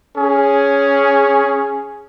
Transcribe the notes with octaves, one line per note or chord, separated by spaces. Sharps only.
C#4 G#4